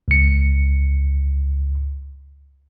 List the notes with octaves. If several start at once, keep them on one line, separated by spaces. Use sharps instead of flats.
C#2 C#7